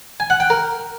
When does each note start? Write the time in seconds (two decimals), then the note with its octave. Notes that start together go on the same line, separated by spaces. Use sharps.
0.20 G#5
0.30 F#5
0.40 G5
0.50 A#4